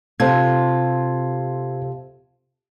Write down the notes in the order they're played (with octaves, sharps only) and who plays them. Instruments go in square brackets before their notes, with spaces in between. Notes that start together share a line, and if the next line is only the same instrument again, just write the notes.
[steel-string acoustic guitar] C3 F4 A4 [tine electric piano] C5 G#6